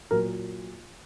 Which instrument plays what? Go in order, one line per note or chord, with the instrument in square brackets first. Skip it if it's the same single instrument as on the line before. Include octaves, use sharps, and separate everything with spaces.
[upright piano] A#2 F#3 A#4